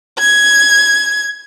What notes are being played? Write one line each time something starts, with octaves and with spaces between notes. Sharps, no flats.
G#6